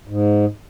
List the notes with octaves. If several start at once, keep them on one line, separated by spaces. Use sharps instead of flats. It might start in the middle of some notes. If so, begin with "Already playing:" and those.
G#2